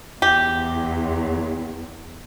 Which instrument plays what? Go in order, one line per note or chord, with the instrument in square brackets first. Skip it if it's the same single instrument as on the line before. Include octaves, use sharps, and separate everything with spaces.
[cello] E2 [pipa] G4